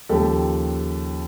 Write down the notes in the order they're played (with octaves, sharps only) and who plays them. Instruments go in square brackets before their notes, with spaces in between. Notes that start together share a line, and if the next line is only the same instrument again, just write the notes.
[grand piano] D#2 C#3 F3 G4 A4